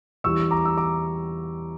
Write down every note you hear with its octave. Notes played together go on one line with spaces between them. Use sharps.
E2 E3 G3 C#6 E6
A#5 D6
E6
A#5 D6